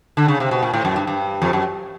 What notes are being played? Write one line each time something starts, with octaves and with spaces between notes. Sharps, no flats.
D3
C#3
C3
B2
A#2
A2
F#2
G2
G2
F2
F#2